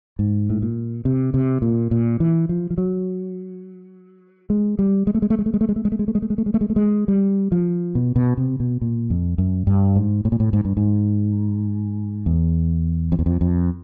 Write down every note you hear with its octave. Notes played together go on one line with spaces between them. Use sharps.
G#2
A2
A#2
C3
C3
A#2
A#2
E3
F3
F3
F#3
G#3
G3
G#3
A3
G#3
A3
G#3
A3
G#3
A3
G#3
A3
G#3
A3
G#3
A3
G#3
A3
G#3
A3
G#3
A3
G#3
A3
G#3
G3
F3
B2
B2
C3
B2
A#2
F2
F#2
G2
G#2
A2
A#2
A2
G#2
G2
G#2
E2
F2
E2
F2
F2